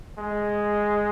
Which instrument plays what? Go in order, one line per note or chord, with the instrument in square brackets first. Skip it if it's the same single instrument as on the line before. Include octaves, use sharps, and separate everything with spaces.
[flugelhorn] G#3